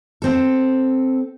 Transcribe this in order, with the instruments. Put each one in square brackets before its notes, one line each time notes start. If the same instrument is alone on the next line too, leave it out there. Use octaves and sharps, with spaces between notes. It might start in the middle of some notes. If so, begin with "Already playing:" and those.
[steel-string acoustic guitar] C4 A4